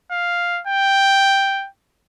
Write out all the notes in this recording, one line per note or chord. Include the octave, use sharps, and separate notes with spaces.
F5
G5